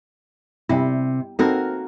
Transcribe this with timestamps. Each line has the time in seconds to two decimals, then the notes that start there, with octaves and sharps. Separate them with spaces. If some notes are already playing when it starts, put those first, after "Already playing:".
0.69 C3 G3 E4
1.39 A#3 C4 D#4 F#4 A4 A#4